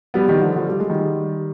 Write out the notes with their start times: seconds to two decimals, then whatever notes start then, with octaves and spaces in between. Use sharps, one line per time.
0.14 G3 B3
0.28 D#3 G3
0.41 D3 F3
0.56 D3 F3
0.69 G3
0.80 G#3
0.89 D#3 G3